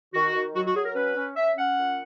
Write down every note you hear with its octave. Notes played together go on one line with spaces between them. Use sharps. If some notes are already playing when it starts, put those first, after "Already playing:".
D#3 F#4
D#3
F#3 F#4
F#4
F#3 G#4
A#4
C#4 B4
C#4
C#4 E5
C#4 F#5
A#2